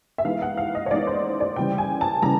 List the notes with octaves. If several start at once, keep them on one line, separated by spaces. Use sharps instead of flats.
E5
E3 G#3 B3 D#4 F5
F#5
F5
D#5
C#5
E3 G#3 B3 D#4 D5
C5
D5
C#3 E3 G3 G5
G#5
A5
C#3 E3 G3 A#5